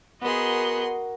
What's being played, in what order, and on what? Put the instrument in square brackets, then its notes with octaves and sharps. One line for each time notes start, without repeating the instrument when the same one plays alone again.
[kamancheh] B3 G#4 [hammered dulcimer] F#4 A#4 [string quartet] D#5 F#5 C6